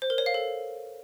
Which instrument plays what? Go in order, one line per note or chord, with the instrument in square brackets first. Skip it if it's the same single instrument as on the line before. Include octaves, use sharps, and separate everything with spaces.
[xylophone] C5
A#4
C#5
F5
A4